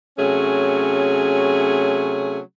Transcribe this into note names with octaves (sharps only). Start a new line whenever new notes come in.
C3 F#3 A3 C#4 G#4